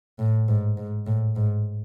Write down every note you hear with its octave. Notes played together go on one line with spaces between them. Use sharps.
A2
G#2
G#2
A2
G#2